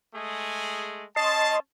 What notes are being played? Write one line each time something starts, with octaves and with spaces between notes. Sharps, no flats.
G#3 A3 G#4
C#4 D#5 A5 C6